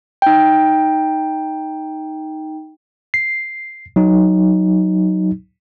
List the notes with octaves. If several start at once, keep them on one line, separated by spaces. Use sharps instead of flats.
D#4 G5
C7
F#3 D#4